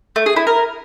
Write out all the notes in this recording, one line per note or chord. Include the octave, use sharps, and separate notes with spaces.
A3
G#4
E4
A#4